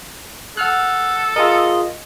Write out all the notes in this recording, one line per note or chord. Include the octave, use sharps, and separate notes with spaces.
A4 F#5 F6 F#6
F4 G#4 A#4 D#5